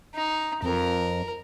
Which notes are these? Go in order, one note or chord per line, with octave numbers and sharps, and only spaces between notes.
D#4
F2 A#4